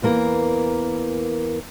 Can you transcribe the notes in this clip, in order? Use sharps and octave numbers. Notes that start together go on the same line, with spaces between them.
E2 E3 A#3 A#4